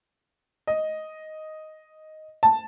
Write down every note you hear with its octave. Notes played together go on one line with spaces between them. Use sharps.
D#5
A5